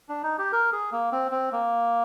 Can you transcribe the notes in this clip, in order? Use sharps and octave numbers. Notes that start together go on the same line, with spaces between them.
D4
D#4
G4
A#4
G#4
A#3
C4
C4
A#3